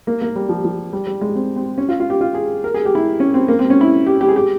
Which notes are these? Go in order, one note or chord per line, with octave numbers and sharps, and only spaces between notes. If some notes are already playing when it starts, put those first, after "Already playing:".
A#3
A#3
G3
F3
F3
G3
G3
G#3
C4
C4
C#4
F4
F4
G4
F4
G#4
A#4
G#4
G4
E4
C#4
C4
A#3
C4
C#4
E4
G4
G4
G#4
G4